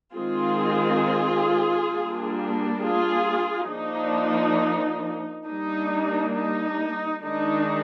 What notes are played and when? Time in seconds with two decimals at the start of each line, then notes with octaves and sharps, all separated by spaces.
0.14 D#3 G#3 C4 F4 G#4
1.91 G3 A#3 D4
2.80 F4 G#4
3.69 F3 A#3 D4 D#4
5.46 G3 A#3 D4 D#4
6.34 D#4
7.23 D#3 G#3 D4 D#4